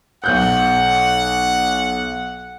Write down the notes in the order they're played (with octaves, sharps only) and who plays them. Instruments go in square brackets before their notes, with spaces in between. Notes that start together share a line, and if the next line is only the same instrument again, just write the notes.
[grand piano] B1 F#6 G6 [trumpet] F#5